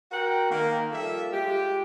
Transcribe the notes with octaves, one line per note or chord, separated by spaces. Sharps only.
F#4 A#4 F#5 G5
D#3 A#3
F3 G3 A#3 A4 E5
G#3 F4 G4